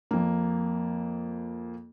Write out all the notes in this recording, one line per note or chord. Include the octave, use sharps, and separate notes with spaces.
F2 A#3